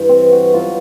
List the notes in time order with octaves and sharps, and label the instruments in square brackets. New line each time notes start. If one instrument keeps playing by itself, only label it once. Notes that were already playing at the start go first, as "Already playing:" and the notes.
Already playing: [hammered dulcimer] G2 E3
C4
F#4
B2 F#3 F4